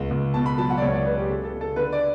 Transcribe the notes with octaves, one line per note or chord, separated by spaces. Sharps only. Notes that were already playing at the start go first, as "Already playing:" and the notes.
Already playing: C#2
C#2
B2 A5
B5
F#3 A5
F#5
D5
C#2 C#5
D5
C#3 B4
G4
C#3 A4
A4
C#3
A4
D3 B4
D5